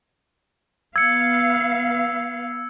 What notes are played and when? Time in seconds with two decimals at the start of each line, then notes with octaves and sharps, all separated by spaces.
0.96 B3 F5 E6 G#6 C#7